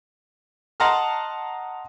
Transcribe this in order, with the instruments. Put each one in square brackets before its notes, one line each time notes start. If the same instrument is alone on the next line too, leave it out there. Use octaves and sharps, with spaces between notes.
[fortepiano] D#5 F#5 A5 A#5 C6 F6